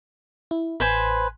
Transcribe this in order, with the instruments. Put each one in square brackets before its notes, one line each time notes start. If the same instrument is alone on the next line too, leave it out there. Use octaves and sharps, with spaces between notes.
[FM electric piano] E4
[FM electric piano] A1 [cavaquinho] B4 C5 G#5